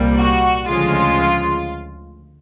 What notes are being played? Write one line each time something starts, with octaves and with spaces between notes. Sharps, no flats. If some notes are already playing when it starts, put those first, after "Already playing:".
Already playing: C2 A#2 G3 A#3
F#4
D2 C#3 F3 G#3 F4